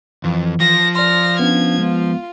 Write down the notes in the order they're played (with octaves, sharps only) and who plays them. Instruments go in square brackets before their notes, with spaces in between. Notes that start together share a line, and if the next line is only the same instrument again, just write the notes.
[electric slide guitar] F2 [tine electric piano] E3
[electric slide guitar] F3 [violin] A#6
[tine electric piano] D5 C6 [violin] F6 A#6
[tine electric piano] B3 C#4 D4 [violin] G#6
[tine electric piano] G#3 B3 [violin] F4